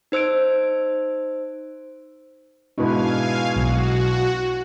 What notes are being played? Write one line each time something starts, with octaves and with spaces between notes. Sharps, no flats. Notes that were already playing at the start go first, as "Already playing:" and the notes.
D#4 C5 E6 G#6 D7
G#2 B2 D4 E4 B4 F5 G#5
B1 F#4